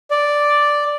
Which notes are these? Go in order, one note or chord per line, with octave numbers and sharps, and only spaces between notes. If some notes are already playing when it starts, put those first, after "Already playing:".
D5